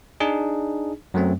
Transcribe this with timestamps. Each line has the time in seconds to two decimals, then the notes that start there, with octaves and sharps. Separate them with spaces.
0.20 D4 D#4 G#4
1.14 F#2 F#3 A3 C4